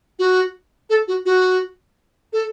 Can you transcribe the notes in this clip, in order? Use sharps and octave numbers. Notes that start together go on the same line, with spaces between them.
F#4
A4
F#4
F#4
A4